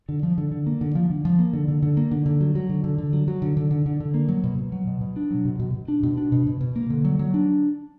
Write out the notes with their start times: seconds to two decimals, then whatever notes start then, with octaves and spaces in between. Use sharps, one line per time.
0.09 D3
0.23 F3
0.38 D3
0.52 D3
0.67 A#3
0.81 D3
0.95 F3
1.10 D3
1.25 F3
1.39 A#3
1.53 D3
1.68 D3
1.82 D3
1.97 A#3
2.11 D3
2.26 D3
2.41 F#3
2.55 F#3
2.69 D3
2.84 D3
2.98 D3
3.13 F#3
3.28 F#3
3.42 D3
3.57 D3
3.71 D3
3.86 D3
4.00 D3
4.14 A#3
4.28 F#3
4.44 B2
4.58 B2
4.72 F#3
4.87 B2
5.01 B2
5.16 D4
5.31 F#3
5.45 B2
5.60 B2
5.74 B2
5.88 D4
6.03 B2
6.17 D4
6.32 B2
6.47 B2
6.61 B2
6.76 A#3
6.90 D3
7.05 F#3
7.19 F#3
7.34 D4